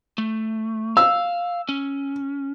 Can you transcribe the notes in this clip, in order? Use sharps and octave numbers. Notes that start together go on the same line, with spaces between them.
A3
F5 E6
C#4